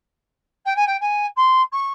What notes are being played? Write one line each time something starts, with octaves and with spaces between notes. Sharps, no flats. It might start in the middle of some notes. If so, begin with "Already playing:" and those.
G5
G#5
G5
G#5
C6
C#6